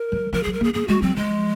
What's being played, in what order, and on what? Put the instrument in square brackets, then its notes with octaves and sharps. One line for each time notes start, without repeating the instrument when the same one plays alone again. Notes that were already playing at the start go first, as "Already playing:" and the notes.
Already playing: [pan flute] A#4
[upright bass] F#3
[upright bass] F3 [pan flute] A#4
[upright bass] F#3 [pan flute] G#4
[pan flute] A#4
[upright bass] A#3 [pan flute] G#4
[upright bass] A#3 [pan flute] G#4
[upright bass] G#3 [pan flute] F#4
[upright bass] F#3 [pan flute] C4
[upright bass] F3 [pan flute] G#3